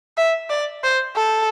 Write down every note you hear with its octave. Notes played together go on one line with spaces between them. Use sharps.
E5
D5
C5
A4